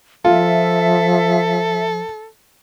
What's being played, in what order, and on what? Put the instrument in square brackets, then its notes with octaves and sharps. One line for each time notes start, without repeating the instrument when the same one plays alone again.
[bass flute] F3 [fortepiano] F4 [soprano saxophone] A4 [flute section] E5